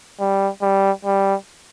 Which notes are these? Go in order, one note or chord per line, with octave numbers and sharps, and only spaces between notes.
G3
G3
G3